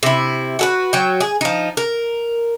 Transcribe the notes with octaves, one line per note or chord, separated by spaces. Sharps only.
C3 E4
F#4 A4 B4
F#3 G5
G#4
F3 D#4
A#4